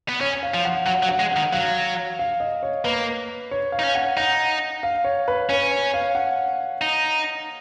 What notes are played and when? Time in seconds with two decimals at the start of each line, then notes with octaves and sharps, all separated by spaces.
0.09 B3
0.21 C#4 C#5
0.43 F5
0.54 F3
0.65 F#5
0.86 F#3 F#5
1.03 F#3
1.09 F#5
1.19 G#3
1.31 F#5
1.36 D#3
1.52 F#3 F5
2.19 F5
2.40 D#5
2.63 C#5
2.85 A#3 B4
3.51 C#5
3.72 F5
3.79 D#4
3.84 C#4
3.95 F#5
4.17 D#4 F#5
4.83 F5
5.04 C#5
5.28 B4
5.49 C#4 C#5
5.71 C#5
5.94 F5
6.15 F#5
6.81 D#4